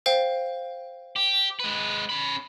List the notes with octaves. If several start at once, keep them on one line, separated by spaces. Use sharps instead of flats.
C5 F5 G5
G4
G#3 B4
C#4 B5